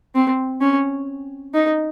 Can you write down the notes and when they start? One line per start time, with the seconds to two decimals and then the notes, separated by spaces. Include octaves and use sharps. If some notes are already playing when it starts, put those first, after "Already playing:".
0.15 C4
0.61 C#4
1.54 D#4